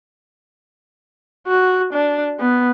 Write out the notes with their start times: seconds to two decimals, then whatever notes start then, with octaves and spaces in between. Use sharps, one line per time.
1.47 F#4
1.93 D4
2.40 B3